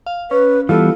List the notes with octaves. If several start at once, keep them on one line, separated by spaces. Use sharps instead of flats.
F5
C#4 B4
E3 G3 B3 F4 A4